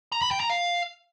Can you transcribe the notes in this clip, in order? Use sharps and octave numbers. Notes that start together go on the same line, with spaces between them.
A#5
B5
G5
A#5
F5